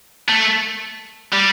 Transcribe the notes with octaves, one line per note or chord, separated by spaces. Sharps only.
A3
G3